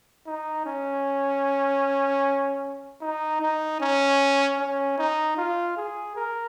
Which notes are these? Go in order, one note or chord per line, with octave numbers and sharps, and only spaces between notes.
D#4
C#4
D#4
D#4
C#4
C#4
D#4
F4
G#4
A#4